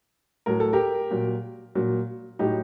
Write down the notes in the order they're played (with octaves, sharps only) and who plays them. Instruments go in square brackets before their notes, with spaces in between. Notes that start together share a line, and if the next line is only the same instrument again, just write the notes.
[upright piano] A2 F#3 A#4
A4
G4 A#4
A#2 F#3
A#2 F#3
A2 F#3 D#4 G4